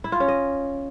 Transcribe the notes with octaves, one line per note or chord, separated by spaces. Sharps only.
E4
F4
C#4
D#5